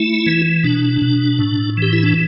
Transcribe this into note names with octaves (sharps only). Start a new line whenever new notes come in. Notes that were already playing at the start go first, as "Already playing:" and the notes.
Already playing: A3 E4
E3
B2 D4
B2
A2
E3 G4
E4
D4